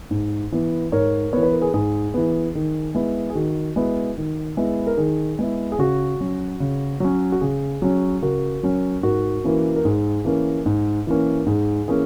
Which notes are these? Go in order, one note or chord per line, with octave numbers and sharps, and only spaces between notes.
G#2
E3 B3
G#2 A#4 C#5
E3 B3 C#5
B4
A#4
G#4 B4
G#2 G#4
E3 B3
D#3
G#3 B3 E4
G#4
D#3 F#4
G#3 B3 E4
D#3
G#3 B3 E4
A#4
D#3 G#4
G#3 B3 E4
G#4
C#3 F#4
F#3 C#4
C#3
F#3 C#4
F#4
C#3 G#4
F#3 C#4
C#3 F#4 A#4
F#3 C#4
G#2 F#4 A#4
E3 A#3 C#4
A#4
G#2 G#4
E3 A#3 C#4
G#2
E3 A#3 C#4
G#2 G#4
E3 A#3 C#4 G#4